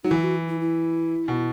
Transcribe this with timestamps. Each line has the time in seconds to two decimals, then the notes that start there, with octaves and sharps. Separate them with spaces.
0.04 F#3 D#4
0.11 E3 E4
0.24 F#4
0.49 E4
0.60 E4
1.28 B2